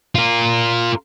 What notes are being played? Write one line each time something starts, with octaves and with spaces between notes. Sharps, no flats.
F4 A#4